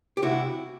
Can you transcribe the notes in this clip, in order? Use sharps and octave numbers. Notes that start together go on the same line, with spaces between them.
G4
C3 E4 F#4